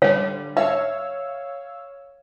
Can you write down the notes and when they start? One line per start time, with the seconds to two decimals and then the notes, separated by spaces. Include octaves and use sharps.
0.02 D3 G3 C#5 F5
0.57 C#5 E5 F5 E6